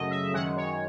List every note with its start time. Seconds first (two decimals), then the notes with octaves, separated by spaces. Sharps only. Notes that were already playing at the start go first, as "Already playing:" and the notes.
Already playing: F#2 C#3 F#3 A3 D#5
0.10 E5
0.33 F#2 D#3 G#3 F#5
0.57 C#5